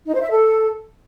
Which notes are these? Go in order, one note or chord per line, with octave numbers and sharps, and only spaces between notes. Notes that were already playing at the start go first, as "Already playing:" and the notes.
D#4
C5
E5
A4